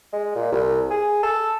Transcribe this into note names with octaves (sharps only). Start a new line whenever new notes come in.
G#3
A#2
C2
G#4
A4